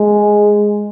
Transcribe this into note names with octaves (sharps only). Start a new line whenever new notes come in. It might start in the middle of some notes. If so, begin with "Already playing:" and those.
Already playing: G#3